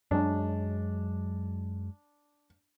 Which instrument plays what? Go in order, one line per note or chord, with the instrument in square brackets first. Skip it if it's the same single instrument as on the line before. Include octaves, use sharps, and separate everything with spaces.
[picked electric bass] F#2 F#3 G#3 [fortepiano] D4